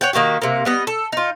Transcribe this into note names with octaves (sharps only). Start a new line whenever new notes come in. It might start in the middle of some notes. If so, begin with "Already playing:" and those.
C#5 F#5 G5
D#3 A#3 F#4 G4
C3 A#3
G3 B3 D#5
A4
D#4 F4